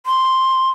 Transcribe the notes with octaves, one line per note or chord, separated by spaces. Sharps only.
C6